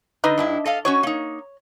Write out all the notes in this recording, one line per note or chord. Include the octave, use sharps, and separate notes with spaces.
D3 D#4 B4 D#5
G2 D4 E4
A4 D#5 F5
C#4 F#4 C#5 D#5
A#3 D#4